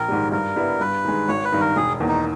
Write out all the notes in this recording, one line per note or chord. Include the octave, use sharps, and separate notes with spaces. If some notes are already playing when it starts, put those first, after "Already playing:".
Already playing: A#1 A#4
G#2 D#3 G3
G2 A#4
G3 B3 E4
G2 B4
D#3 G#3
G#1 C#5
B4
G2 D#3
A#4
E1 G#4
E2 D#3 A#3
D#4